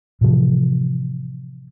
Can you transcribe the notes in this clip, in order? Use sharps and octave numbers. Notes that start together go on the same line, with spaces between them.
A2 C3 E3 F3